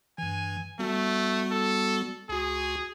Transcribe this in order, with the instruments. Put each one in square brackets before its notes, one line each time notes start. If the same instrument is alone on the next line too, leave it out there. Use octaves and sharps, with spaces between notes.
[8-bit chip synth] G2 E3 [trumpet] G#5
[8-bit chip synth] G3 B3 F#4 [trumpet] A3
[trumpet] A4
[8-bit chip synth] C#2 F#4 [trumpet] G#4